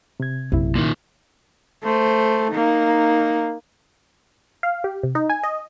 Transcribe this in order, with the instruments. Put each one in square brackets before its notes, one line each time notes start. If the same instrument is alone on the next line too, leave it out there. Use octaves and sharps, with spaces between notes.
[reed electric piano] C3 G#6
[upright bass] A#1 F#2 [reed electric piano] C3 E4
[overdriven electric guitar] A#2 D#3
[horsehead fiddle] A3 C5
A#3 D#4
[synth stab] F5
G4
C3
D#4
G#5
D#5